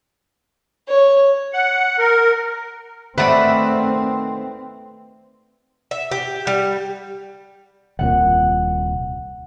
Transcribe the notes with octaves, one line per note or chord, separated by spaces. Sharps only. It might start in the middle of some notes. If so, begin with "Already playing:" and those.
C#5
F#5
A#4
D#3 A3 C4 B4 C5 D5 E5 F#5
E5
G4
G3
D#1 C2 A#2 F#5